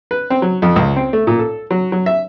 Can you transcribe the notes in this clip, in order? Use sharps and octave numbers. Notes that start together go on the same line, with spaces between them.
B4
C4
F#3
F2
C#2
C4
A3
A#2
A4
F#3
F#3
E5